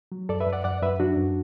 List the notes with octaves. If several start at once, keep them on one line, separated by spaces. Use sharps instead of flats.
F#3
F#2 A4 D5
B4 E5
F#2
D5 F#5
F#2 D5 F#5
F#2 B4 E5
F#3 D4 F#4
F#2